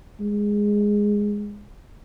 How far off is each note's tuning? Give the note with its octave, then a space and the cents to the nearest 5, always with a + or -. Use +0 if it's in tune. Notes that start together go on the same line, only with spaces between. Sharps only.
G#3 -10